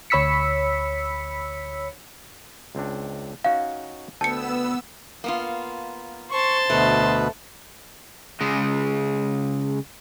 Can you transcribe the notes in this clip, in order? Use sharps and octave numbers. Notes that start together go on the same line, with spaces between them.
D2 C#5 B5 E6 B6 C#7
C#2 C4 D4
C#4 D#4 F#4 F5
D2 B3 A4 G5 A5 E6 C#7
A#3 B3 F4
C5 A5 C#6
D2 B2 A3 B4
C#3 G#3